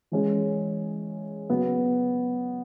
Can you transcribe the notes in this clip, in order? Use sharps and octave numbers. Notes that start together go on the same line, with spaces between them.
E3 G#3 C#4 G#4
C#3 F#3 B3